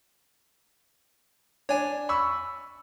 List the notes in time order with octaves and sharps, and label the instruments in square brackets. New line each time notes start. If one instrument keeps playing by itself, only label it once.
[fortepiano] D4 [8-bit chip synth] C#5 G#5
[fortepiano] B5 C#6 E6